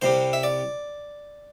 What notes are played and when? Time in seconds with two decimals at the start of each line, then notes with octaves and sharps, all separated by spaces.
0.02 C2 C3 G3 C5
0.33 E5
0.43 D5